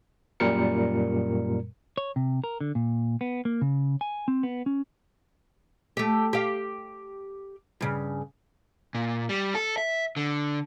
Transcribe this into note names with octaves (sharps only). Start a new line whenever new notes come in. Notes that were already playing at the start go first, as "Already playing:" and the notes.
F#2 A#2 G3 A#4 C#7
C#5
C3
A#4
D3
A#2
B3
A#3
C#3
G#5
C4
B3
C#4
A3 G4
G4 F5
G2 C#3
A#2
G3
A4
E5
D3